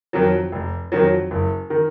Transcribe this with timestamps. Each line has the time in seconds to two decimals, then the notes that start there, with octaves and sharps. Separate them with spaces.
0.13 F2 D#3 F#3
0.52 F1
0.92 F2 D#3 F#3
1.31 F#1
1.70 D#3